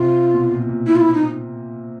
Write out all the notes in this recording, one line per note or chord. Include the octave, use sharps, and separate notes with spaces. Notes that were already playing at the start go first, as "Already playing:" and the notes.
Already playing: C3 F4
B2
A#2
A#2
E4
F4
E4
D#4